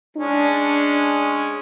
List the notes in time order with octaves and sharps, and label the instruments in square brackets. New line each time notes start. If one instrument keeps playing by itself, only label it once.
[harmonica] G#3 C#4 [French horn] D4